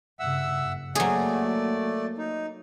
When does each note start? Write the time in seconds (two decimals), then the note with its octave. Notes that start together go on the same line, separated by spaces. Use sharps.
0.19 G2 C#3 E5 F#5 E6
0.60 F#1
0.95 F#3 A3 A#3 G#4 D5
2.18 D#4